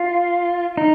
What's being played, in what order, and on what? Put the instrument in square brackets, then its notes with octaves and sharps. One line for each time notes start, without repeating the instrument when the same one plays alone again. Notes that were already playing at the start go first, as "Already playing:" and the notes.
Already playing: [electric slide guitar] F4
D#4